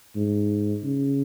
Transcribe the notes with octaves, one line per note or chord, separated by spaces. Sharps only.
G#2
C#3